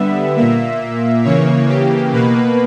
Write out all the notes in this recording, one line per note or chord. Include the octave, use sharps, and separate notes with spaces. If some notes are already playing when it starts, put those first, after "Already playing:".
Already playing: D3 G3 B3 E5
A#2 A#3 E5
C#3 E3 A#3 C#5
G4
B2 A#3 B4